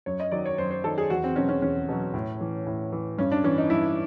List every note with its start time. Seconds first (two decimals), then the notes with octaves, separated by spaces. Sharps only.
0.06 F#2 C#5
0.20 D#5
0.32 D#3 F#3 D5
0.46 C#5
0.58 F#2 C5
0.71 C5
0.84 D#3 F#3 A4
0.98 G#4
1.10 E2 F#4
1.24 C4
1.36 B2 F#3 C#4
1.49 C#4
1.62 E2 C#4
1.89 B2 F#3
2.14 A2
2.41 E3
2.66 A2
2.92 E3
3.18 G2 C#4
3.32 D4
3.44 E3 C#4
3.58 D#4
3.70 G2 E4